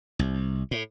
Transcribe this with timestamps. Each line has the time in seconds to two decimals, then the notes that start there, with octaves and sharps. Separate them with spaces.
0.19 C2
0.71 A2